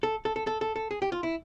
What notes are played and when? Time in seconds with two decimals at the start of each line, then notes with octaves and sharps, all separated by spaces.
0.03 A4
0.25 A4
0.36 A4
0.47 A4
0.61 A4
0.76 A4
0.91 G#4
1.02 G4
1.12 F4
1.23 E4